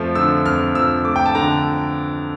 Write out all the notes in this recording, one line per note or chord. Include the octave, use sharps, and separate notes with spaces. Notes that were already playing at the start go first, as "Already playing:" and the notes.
Already playing: F2 F3 A3
D3 E6
F2 F6
F3 E6
A3 D6
G5
A5
D3 A#5